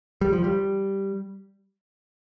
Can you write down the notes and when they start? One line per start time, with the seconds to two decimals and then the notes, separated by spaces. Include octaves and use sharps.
0.21 G3
0.33 F3
0.44 G3